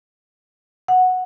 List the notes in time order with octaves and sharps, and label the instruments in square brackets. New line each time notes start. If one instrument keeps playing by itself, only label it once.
[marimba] F#5